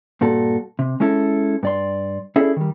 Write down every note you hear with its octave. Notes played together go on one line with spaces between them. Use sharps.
G2 A#2 F#4 A4
C3
G#3 C#4 E4 A4
G2 D5 C6
C#4 E4 G#4 A4 D5
D#3 G3